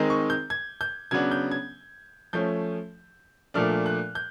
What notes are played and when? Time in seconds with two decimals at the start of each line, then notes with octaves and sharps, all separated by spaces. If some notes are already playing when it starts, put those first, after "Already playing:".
Already playing: D#3 G#3 C4 D#4
0.10 C#6
0.30 G6
0.50 G#6
0.81 G6
1.11 C#3 F#3 B3 D4 G#6
1.31 G6
1.51 G#6
2.33 F3 A3 C#4 G6
3.54 A#2 F3 A3 D4 F6
3.86 F#6
4.15 G6